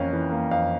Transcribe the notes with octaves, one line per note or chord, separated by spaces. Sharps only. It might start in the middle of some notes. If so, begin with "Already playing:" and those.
Already playing: F2 E3 A#3 C#4 F5
E3
A#3
F2 F5